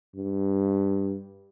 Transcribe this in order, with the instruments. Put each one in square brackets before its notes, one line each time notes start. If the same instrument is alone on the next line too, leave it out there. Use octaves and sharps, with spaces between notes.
[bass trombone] G2